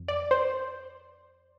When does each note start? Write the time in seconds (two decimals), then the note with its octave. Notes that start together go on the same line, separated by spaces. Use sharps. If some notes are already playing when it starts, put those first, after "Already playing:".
Already playing: F2
0.08 D5
0.31 C5